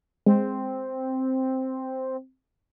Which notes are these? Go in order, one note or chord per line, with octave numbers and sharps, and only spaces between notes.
G#3 C4